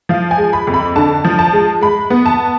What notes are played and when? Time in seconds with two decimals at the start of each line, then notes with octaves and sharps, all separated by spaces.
0.09 F3 F5
0.31 G#5
0.38 G#3
0.53 B5
0.67 F2
0.74 B5
0.96 D3 A5
1.25 F3
1.39 A5
1.53 G#3
1.81 G#3 B5
2.10 B3
2.26 A5